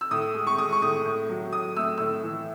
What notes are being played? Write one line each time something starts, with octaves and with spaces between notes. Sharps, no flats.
E6
A2 D#6
G#3
C#6
G#3 D#6
C#6
A2 D#6
A2
F#3
A2 D#6
A3 E6
A2 E6
E3